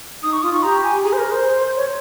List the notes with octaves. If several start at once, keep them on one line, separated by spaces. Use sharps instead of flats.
D#4 D#6
C#6
F4 D#6
C#6
G4 A#5
G#5
G#4
C5
A#4
C5
C#5